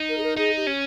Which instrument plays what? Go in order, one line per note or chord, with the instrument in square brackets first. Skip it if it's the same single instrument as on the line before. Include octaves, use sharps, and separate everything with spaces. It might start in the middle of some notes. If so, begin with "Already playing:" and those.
Already playing: [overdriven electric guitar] D#4
[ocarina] A#4
G#4
A#4
[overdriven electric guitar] D#4 [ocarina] G#4
[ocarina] G4
[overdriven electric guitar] C#4